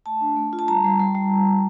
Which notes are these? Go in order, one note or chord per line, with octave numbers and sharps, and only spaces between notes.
A3 A5
D4
A3
F4
A5
G3 A#5
G3
G3
G3